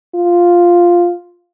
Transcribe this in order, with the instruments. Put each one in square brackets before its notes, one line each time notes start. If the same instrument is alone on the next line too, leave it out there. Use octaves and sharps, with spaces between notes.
[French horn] F4